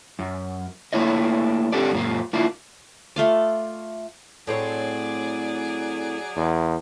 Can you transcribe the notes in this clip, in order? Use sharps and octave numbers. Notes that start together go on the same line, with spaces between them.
F#2
A3 A#3 D4 E4 C#5 D#5
C4 D4 G4 A4 D5
F#2 A#2 F4
A#3 D4 E4 F4
A3 F4 D5
A2 F#3 C4 G#4 C#5 D5
E2